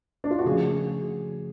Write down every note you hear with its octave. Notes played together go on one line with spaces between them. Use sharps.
D4
F4
F#4
C#3 F3 A3 C#4 G#4